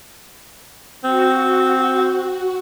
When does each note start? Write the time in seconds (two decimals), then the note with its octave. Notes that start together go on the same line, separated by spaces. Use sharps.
1.04 C4 F#4